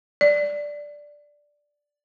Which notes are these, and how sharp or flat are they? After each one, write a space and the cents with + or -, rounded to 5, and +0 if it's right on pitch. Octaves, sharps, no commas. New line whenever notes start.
D5 +0